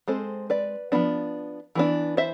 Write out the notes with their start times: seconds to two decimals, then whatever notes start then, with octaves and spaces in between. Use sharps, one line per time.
0.08 G#3 C4 A4 C5
0.50 B4 D5
0.92 F3 B3 D4
1.75 E3 B3 D4
2.17 C5 E5